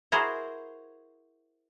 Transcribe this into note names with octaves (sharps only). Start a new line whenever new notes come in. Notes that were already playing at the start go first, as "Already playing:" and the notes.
E4 F#4 G#4 A#4 C5